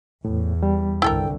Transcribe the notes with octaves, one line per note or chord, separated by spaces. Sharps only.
E2 A2
G3
C2 G2 D3 E4 A4 A#4 G5